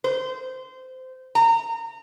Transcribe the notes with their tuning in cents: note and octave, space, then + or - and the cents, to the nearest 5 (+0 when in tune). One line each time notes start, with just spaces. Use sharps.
C5 -20
A#5 -25